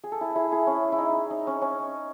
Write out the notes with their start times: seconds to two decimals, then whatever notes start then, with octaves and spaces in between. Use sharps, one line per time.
0.04 G#4
0.12 A4
0.21 E4 G#4
0.35 E4 G#4
0.52 E4 G#4
0.67 C#4
0.92 E4
0.98 D#4
1.31 D#4
1.47 C#4
1.62 C#4